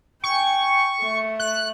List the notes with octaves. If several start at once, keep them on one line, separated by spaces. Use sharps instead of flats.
G5 G#5 C#6
A3
F#6